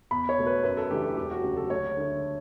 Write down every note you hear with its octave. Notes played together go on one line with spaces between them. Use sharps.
E2 B5
C#5
B2 A3
B4
F#2 B4
A4
E3 A3 D4 G4
A4
E1 G4
F#4
D2 C#3 F#3
A4
D2 C#5
D3 A3